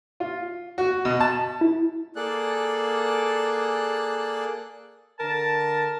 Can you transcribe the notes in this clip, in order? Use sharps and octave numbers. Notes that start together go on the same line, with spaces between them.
F4
F#4
B2
A5
E4
A#3 G#4 A4 D5 F#6
D3 A#4 A5